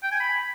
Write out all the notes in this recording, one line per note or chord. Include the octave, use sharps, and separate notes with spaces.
G5
G#5
B5